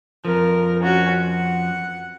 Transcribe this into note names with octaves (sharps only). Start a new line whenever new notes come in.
F2 F3 A#4
C#4 F#4
F#5